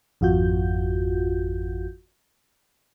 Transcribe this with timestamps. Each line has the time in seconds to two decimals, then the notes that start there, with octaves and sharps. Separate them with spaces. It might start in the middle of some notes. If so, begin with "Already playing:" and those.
0.21 G#1 F2 F4 F#4 G6